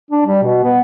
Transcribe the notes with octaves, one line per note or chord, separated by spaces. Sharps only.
D4
G3
B2
B3